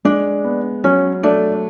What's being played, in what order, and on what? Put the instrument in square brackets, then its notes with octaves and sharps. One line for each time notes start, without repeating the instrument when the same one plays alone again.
[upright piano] G#3 [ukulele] D4
[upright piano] B3
[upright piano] F#3 [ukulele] C#4
[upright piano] A3 [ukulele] D4